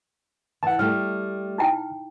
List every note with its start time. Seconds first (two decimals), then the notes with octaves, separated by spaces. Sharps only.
0.63 E3 F#5 A5
0.79 G3 A3 F6
1.58 D#4 E4 G5